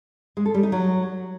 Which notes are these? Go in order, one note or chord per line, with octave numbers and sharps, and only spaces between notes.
G#3
A4
G3
D#4
F#3